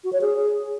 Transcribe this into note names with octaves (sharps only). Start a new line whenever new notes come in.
F#4
C#5
G#4